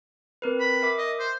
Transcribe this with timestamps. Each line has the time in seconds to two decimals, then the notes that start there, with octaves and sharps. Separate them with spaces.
0.42 C4 A#4 B4
0.60 B5
0.82 A#4 E5 D6
0.98 D#5
1.19 C5